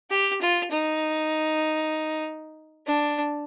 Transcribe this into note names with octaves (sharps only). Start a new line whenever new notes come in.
G4
F4
D#4
D4